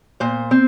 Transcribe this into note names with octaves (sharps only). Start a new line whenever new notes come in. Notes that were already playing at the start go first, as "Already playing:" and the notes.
A#2 C5
C4